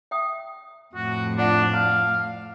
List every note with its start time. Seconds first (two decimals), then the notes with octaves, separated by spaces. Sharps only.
0.11 E5 G5 D#6
0.95 F2 A2 F#4
1.38 D4 F4 D5 F#5
1.74 F5 A5